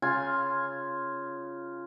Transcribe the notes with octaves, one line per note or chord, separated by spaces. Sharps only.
C#3 F4 G#5